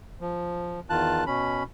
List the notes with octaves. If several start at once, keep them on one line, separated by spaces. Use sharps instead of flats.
F3
E2 D#3 F4 A5 F#6
B2 C#4 B5